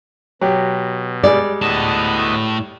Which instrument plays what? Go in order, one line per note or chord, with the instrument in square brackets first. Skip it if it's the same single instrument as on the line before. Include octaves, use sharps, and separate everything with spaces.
[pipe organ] B2 [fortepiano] F#3 G4
[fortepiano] G3 G#3 [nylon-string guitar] D5
[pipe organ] D2 B3 D#5 [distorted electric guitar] A2 A5